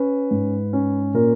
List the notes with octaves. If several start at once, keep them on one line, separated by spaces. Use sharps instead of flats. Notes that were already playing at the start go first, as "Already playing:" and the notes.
Already playing: C#4 B4
G#2
C#4
A#2 A#4